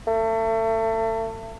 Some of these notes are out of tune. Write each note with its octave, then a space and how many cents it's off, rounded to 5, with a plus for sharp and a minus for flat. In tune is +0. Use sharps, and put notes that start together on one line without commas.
A3 +30